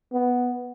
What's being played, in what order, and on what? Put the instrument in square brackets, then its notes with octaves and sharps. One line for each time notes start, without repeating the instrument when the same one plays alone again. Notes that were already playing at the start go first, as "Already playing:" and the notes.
[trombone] B3